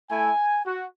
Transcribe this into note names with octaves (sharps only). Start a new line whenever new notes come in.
A3 E4 G#5
F#4